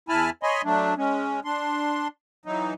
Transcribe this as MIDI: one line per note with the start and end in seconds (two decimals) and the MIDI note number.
0.09 0.30 40
0.09 0.30 64
0.09 0.30 80
0.09 0.30 81
0.09 0.30 83
0.09 0.30 89
0.43 0.62 73
0.43 0.62 75
0.43 0.62 80
0.43 0.62 83
0.43 0.62 84
0.64 0.94 54
0.64 0.94 57
0.64 0.94 62
0.98 1.40 56
0.98 1.40 61
1.45 2.08 62
1.45 2.08 84
2.46 2.74 52
2.46 2.74 54
2.46 2.74 63